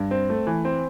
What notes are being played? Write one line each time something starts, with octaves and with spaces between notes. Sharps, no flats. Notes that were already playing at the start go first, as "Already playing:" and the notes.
Already playing: G2
C4
A3
E3
C4